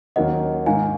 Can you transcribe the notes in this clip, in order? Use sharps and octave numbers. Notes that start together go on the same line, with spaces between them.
D#2 D#3 F#3 A#3 C#4 D#5 F#5
G#2 D#3 A#3 F5 G#5